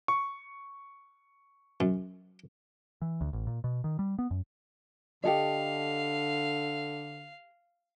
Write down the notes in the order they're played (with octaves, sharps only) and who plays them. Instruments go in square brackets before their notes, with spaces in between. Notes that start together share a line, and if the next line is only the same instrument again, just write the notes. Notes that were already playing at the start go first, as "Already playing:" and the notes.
[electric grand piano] C#6
[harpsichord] F#2
[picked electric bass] E3
D2
A1
A#2
B2
D#3
G3
B3
F#2
[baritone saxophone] D3 [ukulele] G4 A4 D#5 [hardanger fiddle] F5